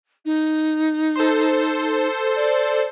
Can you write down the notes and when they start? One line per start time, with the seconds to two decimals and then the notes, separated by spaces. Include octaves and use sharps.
0.25 D#4
1.16 A4 C5
2.36 D5